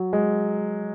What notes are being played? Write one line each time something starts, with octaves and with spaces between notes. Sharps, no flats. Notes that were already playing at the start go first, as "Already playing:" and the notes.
Already playing: F#3
G#3